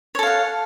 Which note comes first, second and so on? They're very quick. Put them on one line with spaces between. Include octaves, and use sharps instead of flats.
C#5 A4 F5 F#5